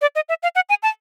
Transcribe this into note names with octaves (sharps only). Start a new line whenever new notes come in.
D5
D#5
E5
F5
F#5
G#5
A5